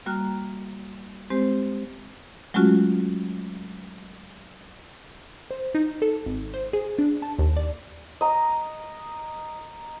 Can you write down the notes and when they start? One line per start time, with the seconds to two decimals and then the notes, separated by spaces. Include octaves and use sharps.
0.06 G3 A#3 F#4 A#5 F6 F#6
1.30 G#3 C4 G4 C5
2.54 F#3 G#3 A3 C#4 F4 F#4
5.51 C5
5.75 D#4
6.02 A4
6.26 G#1
6.54 C5
6.73 G#4
6.99 D4
7.22 A5
7.39 D#2
7.57 D5
8.21 D#5 A#5